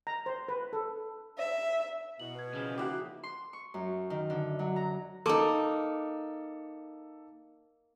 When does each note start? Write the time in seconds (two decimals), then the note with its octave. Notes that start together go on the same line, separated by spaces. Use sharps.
0.07 A#5
0.26 C5
0.48 B4
0.73 A4
1.38 E5
2.20 B2 E4 F#7
2.35 B4 G#6
2.53 C#3 E3 F3
2.78 A#3 D#4 E4 F#4 G4 D6 F#6
3.23 C6
3.53 C#6
3.74 F#2
4.10 D#3
4.30 D3
4.59 F#3
4.76 A#5
5.26 A#3 D#4 A4 D6